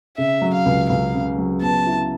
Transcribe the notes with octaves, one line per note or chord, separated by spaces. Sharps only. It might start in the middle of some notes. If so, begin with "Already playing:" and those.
C#3 E5
F#3
F5
C#2
C#2 F5
C#3
F#3
B3 A5
E4